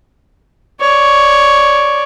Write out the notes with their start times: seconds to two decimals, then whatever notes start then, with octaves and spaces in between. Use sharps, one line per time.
0.81 C#5 D5